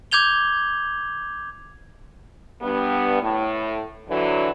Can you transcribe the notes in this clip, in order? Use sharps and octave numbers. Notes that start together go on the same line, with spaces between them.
D6 G6 G#6 F7 G7
G2 B3
A2
D3 E3 F#3